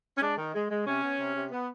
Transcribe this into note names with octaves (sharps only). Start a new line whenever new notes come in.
C#4
G#3 D4
D#3
G#3
G#3
C3 C#4
B3
C3
C3
B3